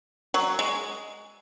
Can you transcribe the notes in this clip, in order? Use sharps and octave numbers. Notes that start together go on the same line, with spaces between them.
F#3
G#3